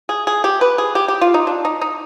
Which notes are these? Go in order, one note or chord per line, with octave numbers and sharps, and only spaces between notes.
G#4
G#4
G4
B4
G#4
G4
G4
F4
D#4
D4
D#4
D#4